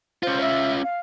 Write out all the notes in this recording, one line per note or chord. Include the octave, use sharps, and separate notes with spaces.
C#4 F4 C5
E5
F5